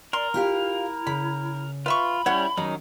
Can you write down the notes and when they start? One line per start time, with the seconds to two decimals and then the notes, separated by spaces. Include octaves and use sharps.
0.13 A#4 D5 C6
0.34 E4 F4 G4 F5
1.07 C#3 B5
1.86 F4 B4 E5 B5 C#6
2.26 G3 C#4 E4 C#5 F#5
2.57 D#3 F#3 C#4 D#4